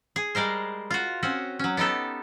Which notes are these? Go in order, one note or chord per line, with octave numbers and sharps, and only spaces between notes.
G#4
G3 G#3 A#4 C5
F4 F#4
C4 C#4 F#4
F#3 C#4
B3 D#4 G4 A4